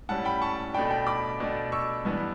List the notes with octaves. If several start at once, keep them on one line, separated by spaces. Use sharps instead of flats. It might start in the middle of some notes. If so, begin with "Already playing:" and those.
A2 G3 C#4 F#5 A5
G5 B5
A5 C#6
B2 A3 D4 G5 B5
G5 B5
B5 D6
B2 A3 D4
C#6 E6
G2 E3 B3 D4